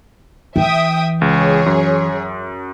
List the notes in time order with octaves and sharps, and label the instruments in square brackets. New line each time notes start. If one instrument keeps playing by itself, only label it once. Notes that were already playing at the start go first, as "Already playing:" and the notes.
[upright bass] E3 [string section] E5 G5 D#6
[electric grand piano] C#2 [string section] G#4 C#5
[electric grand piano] F#2